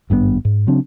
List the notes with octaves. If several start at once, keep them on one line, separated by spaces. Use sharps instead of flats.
G#1 G2 D3 B3
G#2
C#3 F#3 C4 D4